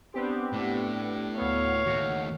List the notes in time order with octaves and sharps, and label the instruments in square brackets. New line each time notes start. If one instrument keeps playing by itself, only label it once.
[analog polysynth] B3 G4 [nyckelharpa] C4 D4
[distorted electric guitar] A2 [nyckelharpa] D4
[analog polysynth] D2 B3 [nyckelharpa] C#5 F5
[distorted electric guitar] D#2 A3 [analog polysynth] F#4